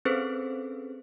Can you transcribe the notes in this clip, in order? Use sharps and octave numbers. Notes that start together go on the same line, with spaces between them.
C4 C#4 G#4 A4 B4 C5